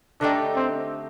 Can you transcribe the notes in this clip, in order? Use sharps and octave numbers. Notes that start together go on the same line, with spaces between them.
D3 A3 D4 D#4 G4
C4